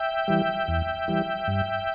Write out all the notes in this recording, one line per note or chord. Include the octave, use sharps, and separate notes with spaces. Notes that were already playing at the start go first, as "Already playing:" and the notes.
Already playing: E5 G5
E3 G3
E2
E3 G3
G2